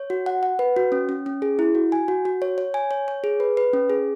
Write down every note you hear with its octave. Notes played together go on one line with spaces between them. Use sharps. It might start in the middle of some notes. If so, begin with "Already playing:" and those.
Already playing: C#5
F#4
F#5
F#5
B4
F#4
C#4
C#4
C#4
G#4
E4
F#4
G#5
F#4
F#4
C#5
C#5
G#5
C#5
C#5
G#4
B4
B4
C#4
G#4